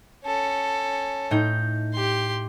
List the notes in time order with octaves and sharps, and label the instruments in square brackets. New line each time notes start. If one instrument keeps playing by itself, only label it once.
[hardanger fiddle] C#4 A4
[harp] A2 D#4 G6
[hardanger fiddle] G4 C6